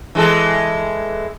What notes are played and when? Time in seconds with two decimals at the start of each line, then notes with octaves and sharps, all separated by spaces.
0.15 E3 G#3 A4